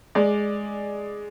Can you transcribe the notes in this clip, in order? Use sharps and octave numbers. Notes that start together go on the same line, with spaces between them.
G#3 D5